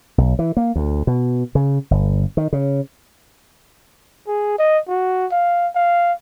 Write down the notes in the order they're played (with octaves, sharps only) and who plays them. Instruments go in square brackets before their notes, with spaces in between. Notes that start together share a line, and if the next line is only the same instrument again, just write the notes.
[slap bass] B1
E3
A#3
D2
B2
C#3
G1
D#3
C#3
[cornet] G#4
D#5
F#4
F5
F5